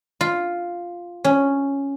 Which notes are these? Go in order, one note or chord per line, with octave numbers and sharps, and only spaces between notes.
F4
C#4